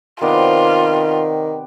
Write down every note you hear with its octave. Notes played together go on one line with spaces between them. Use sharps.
C3 D#3 B3 F4 D5